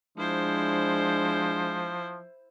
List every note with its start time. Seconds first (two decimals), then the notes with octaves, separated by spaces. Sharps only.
0.18 F3 G#3 D4 E4 C5